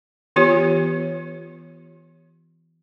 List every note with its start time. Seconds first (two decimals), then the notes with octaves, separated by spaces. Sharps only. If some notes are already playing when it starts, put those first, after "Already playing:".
0.36 E3 B3 F4 G4 C#5